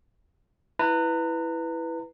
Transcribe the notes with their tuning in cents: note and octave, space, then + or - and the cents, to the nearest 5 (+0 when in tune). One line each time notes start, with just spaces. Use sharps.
E4 +0 B4 +0 A#5 -35